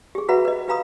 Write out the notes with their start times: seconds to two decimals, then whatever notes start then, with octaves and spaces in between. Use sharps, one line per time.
0.15 G4 G#4
0.29 F#4 B4 E5 F#5 A#5 B5
0.45 B4 D#5
0.68 G4 B4 F5 A#5 B5 D#6